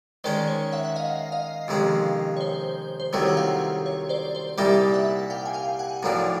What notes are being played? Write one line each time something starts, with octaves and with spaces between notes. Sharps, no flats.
D#3 G#3 C#4 C5 D5
C#5
E5 F#5
F#5
D#5 F5
D#5 F5
F2 C3 D#3 G#3 C#4
C#5
C5
C5
C2 C3 D#3 F#3 A3 C#5
F#5
F5 G5
C#5
C5 D5
C5
C2 A#2 G3 A#3 D#4 D5 E5
E5 F#5
F5 G5
G#5
F5 G5
F#5 G#5
B1 A2 F3 A#3 D4 G#5 A#5